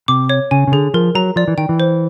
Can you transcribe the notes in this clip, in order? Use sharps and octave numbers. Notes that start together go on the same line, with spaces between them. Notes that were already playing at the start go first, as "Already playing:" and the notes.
C3 D6
C#5
C#3 G#5
C#3
D3 G#4
F3 A#4
F#3 A#5
F3 D5
E3
D#3 G5
E3
C5